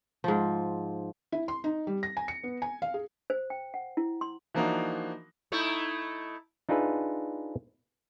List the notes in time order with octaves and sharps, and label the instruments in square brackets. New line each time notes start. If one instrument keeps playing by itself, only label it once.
[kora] G#2 F3
[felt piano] E4
C6
D#4
G3
A#6
G#5
C#7
B3
G#5
F5
G#4
[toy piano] C5
G5
F#5
E4
C6
[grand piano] E3 F3 A#3 D4 D#4 F#4
[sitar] A3 D#4 E4
[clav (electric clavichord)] D4 D#4 F4 G#4 B4 E5